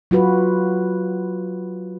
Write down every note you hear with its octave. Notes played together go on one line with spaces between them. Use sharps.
F#3 F4 F#4 B4